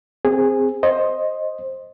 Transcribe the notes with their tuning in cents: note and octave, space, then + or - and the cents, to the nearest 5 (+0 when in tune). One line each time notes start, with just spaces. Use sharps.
C4 +0 G#4 -15
C5 +15 D#5 +0